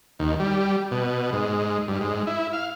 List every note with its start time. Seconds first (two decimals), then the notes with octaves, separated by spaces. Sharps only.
0.19 D#2
0.39 G3
0.91 B2
1.33 G#2
1.88 G2
2.01 G#2
2.27 E4
2.53 F5